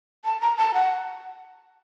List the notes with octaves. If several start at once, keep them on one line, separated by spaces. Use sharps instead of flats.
A5
A#5
A5
F#5